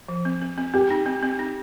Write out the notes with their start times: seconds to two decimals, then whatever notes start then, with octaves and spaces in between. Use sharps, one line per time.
0.09 F3
0.25 C4
0.42 C4
0.58 C4
0.74 C4 G4
0.90 D#4
1.06 C4
1.23 C4
1.39 D#4